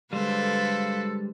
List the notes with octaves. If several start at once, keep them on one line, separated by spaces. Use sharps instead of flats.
D3 G3 G#3 A4 B4 C5 F5